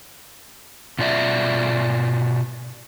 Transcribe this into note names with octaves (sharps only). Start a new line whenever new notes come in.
B2 F4 D5 E5